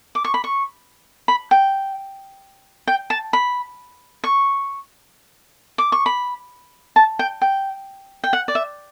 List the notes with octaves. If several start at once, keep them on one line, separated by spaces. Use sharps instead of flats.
D6
C#6
B5
C#6
B5
G5
G5
A5
B5
C#6
D6
C#6
B5
A5
G5
G5
G5
F#5
D5
E5